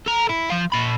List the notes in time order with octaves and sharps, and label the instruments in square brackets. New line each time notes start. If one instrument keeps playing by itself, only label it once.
[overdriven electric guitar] A4 A#5
E4
F3 F5
A#2 B5